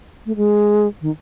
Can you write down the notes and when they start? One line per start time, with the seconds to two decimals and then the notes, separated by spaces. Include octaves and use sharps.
0.26 A3
0.36 G#3
1.01 D#3